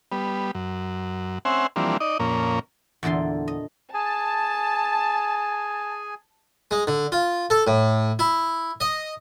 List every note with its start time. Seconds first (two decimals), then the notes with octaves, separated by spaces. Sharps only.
0.12 G3 B3
0.55 F#2
1.45 C4 C#4 C5 E5 F#5 G#5
1.76 E3 F3 G3 A#3 C4 D4
2.00 D#4 D5 D#5
2.20 F2 A#2 A#3 C#4
3.03 E2 A#2 D3 A4 C6
3.48 D#5
3.94 G#4 G#5 A5
6.71 G#3
6.87 D3
7.12 F4
7.50 A4
7.67 A2
8.19 E4
8.81 D#5